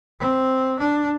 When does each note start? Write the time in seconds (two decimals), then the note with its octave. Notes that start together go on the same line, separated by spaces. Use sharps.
0.20 C4
0.79 D4